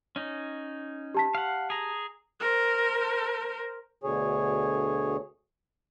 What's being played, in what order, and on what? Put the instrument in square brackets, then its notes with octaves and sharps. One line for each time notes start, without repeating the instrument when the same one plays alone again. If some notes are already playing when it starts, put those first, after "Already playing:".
[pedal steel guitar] C#4 D#4
[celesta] G4 A5 B6
[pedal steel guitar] F5 F#5
G#4 A#5
[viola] A#4 C5
[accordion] D2 B2 D3 G#4 C#5